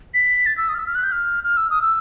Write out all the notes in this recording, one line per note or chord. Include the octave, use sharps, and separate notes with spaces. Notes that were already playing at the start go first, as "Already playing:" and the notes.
B6
A6
E6
D#6
F6
E6
F6
F#6
G6
F6
F6
E6
D#6
E6